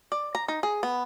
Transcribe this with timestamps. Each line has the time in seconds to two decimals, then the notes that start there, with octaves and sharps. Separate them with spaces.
0.12 D5
0.35 A#5
0.48 D#4
0.63 G#4
0.83 B3